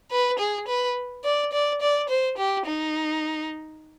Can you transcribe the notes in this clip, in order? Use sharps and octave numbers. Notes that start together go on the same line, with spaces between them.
B4
G#4
B4
D5
D5
D5
C5
G4
D#4